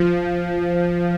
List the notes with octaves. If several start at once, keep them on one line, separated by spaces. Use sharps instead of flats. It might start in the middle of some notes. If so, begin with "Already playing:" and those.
Already playing: F3